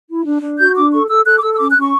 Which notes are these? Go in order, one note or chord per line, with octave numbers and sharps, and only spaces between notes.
E4
D4
D4
F#4 G6
D4 D6
A4 C#6
A4 E6
A4 F#6
D6
A4 E6
E6
C#4 D6
F#6
C#4
C#6